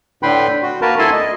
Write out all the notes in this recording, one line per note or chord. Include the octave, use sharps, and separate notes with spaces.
A2 D3 B4 G5 B5 C6
F#4
A#3 F#4 A#4 B4 A5
D2 E4 A4 G#5 A5 C6
D#5